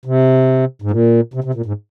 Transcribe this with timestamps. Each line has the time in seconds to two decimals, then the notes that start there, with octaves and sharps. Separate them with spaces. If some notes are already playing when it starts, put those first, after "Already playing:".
0.05 C3
0.82 G#2
0.91 A#2
1.34 C3
1.44 C3
1.54 A#2
1.66 G#2